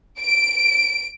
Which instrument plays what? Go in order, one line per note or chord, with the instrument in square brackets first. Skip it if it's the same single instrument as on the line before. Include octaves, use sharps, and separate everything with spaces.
[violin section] D7